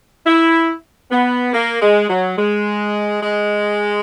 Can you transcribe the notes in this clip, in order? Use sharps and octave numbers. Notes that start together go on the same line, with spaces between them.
E4
B3
A#3
G#3
F#3
G#3
G#3